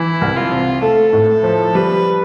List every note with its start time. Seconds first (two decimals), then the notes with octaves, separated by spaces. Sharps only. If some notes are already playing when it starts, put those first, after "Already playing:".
Already playing: E3 E4
0.21 C2
0.36 F4
0.51 C3
0.82 A3 A4
1.13 A2
1.28 A4
1.43 F3
1.75 G3 B4